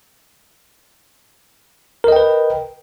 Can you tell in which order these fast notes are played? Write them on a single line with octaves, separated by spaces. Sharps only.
A#4 D#5 G5 B4